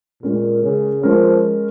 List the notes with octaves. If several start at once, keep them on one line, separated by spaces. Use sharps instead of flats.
A#2 G#3 C#4 A#4
C#3
F3 G#3 C#4 A#4